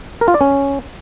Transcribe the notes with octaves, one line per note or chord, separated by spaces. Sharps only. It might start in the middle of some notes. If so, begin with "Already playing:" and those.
A#4
F4
D5
C#4